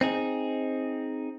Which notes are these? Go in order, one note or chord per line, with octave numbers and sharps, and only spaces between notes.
C4 D#4 G#4